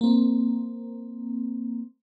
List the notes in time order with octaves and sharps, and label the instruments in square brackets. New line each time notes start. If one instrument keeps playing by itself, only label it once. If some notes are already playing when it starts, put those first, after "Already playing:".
[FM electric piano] A#3 C4